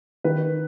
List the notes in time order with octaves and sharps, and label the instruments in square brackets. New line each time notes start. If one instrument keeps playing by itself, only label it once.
[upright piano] D#3 B4